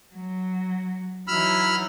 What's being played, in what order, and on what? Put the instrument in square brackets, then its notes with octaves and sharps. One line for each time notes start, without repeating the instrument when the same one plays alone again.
[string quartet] F#3
[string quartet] E3 F#3 D#4 [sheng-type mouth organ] B5 E6 F6